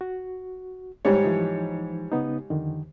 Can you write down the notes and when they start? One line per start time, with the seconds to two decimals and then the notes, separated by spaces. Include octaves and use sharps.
0.01 F#4
1.05 G#2 G3 C#5
1.24 E3 F3 D#4
2.12 C#3 B3 D#4
2.50 F2 D3 D#3